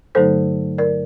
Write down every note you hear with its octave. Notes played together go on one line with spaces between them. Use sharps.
G2 D3 F#3 A3 D#4 A4 C5
A#4 D5